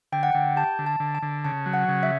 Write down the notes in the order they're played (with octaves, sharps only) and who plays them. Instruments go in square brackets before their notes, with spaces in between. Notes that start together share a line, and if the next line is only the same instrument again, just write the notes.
[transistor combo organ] D3 [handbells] G5
[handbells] F#5
[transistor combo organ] D3 [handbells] G5
[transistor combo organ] G4 [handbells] A5
[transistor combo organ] D3
[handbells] A5
[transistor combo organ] D3
[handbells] A5
[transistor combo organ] D3
[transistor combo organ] C#3 [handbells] A5
[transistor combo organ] F#3
[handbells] F#5
[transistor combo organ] C#3
[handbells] E5